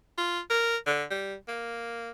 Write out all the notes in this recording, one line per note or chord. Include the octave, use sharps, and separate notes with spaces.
F4
A#4
D3
G3
A#3